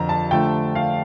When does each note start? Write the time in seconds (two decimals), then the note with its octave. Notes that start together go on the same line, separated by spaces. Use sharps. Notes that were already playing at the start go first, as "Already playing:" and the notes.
Already playing: F2 D3 F3 A#5
0.09 A5
0.31 D3 F3 A3 G5
0.75 F5